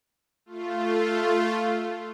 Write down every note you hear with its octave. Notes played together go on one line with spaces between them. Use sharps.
A3 F4